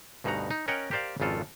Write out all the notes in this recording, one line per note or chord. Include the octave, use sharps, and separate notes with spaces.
D2 G2 B2 D#4 F#5 A#5
D#4
C#4 A#4 C#5 D#5 F#5 G5
G4 A#4 C5 D5 F5
G#1 F2 C#3 F4 A4